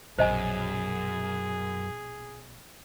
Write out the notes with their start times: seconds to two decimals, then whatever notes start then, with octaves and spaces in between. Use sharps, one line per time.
0.19 A#1 F#2 B2 G#4 C5 D#5 G#5